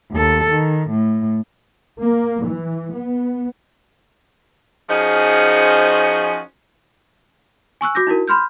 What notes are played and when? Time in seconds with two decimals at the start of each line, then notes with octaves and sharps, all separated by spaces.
0.12 D#2 A4
0.51 D#3
0.91 A2
1.99 A#3
2.44 E3
2.92 B3
4.89 F3 C#4 D#4 F#4 G#4 C5
7.81 G#5 C#6 E6 F#6
7.95 F#4 D6 G6 A#6
8.07 D#4 E4 F#4 A#4
8.27 B5 C6 F6 G6